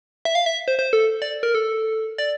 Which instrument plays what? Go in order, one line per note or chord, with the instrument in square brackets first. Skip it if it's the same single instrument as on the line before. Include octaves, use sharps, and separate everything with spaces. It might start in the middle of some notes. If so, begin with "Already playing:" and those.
[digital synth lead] E5
F5
E5
C5
C5
A4
D5
A#4
A4
D5